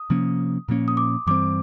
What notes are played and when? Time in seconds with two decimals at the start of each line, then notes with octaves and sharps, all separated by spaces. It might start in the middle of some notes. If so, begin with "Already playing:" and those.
Already playing: D#6
0.10 C3 F3 A#3 C#4
0.68 A#2 F3 A#3 C#4
0.88 D#6
0.97 D6
1.27 G2 E3 G3 C4 D6